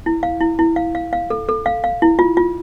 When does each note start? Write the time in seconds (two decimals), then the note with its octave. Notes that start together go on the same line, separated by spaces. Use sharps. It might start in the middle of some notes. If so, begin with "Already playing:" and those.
0.06 E4
0.23 F5
0.41 E4
0.59 E4
0.76 F5
0.95 F5
1.13 F5
1.30 A4
1.49 A4
1.66 F5
1.84 F5
2.02 E4
2.19 F4
2.37 F4